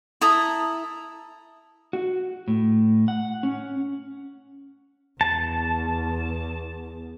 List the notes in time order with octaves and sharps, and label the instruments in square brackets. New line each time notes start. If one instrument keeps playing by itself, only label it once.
[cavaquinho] E4 A4 A#5 D#6
[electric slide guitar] F#4
A2
F#5
C#4
[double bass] E2 [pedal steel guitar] A5